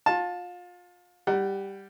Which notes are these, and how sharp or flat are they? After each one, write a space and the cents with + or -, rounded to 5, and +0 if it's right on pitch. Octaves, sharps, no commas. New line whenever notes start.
F4 +30 A5 +0
G3 +5 G4 +0 F#5 +30